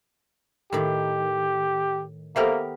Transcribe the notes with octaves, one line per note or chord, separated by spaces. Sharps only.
A2 D#3 G4
A#3 B3 G4 A4 A#4 C5 E5